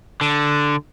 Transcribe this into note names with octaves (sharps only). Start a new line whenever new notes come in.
D3